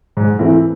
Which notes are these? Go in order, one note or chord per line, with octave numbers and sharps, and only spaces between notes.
G#2
E3 A3 C4 E4